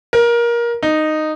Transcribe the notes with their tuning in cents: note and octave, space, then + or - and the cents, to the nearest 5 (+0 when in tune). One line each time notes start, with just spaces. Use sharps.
A#4 +20
D#4 -10